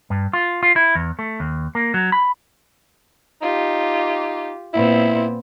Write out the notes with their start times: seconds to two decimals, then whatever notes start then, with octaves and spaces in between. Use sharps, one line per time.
0.10 G2
0.33 F4
0.63 F4
0.76 E4
0.95 E2
1.19 A3
1.40 D#2
1.75 A#3
1.94 F#3
2.12 B5
3.42 D#4 F4 G4
4.73 A#2 B3 C4 E4